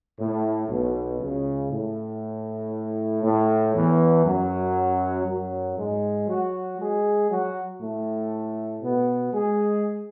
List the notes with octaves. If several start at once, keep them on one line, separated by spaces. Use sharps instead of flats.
A2
B1 B2
C#2 C#3
A2
A2
E2 E3
F#2 F#3
F#2 F#3
G#2 G#3
F#3 F#4
G#3 G#4
F#3 F#4
A2 A3
B2 B3
G#3 G#4